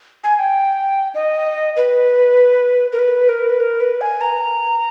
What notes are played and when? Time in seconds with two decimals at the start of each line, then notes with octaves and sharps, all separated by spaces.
0.24 G#5
0.39 G5
1.15 D#5
1.76 B4
2.93 A#4
2.99 B4
3.29 A#4
3.50 B4
3.60 A#4
3.80 B4
4.01 G#5
4.21 A#5